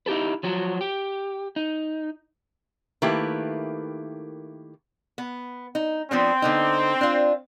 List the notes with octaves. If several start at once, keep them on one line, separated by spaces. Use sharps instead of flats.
D#4 E4 G4 A4 B4
F3 F#3 F#4
G4
D#4
D#3 A3 A#3 E4 G4 B4
B3
D#4
F3 B3 C4 D4
D3 B3 D#4
D4 F4